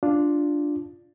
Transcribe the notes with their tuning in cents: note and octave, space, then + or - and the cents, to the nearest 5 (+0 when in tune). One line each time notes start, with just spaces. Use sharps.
D4 +0 F4 +0